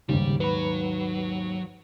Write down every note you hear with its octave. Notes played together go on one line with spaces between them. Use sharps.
D#2 G#2 C#3 G3
F#3 B4 B5